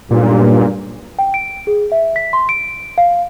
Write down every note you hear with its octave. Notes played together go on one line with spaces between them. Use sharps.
B1 G2 A#2
G5
D7
G#4
E5
B6
C6
D7
F5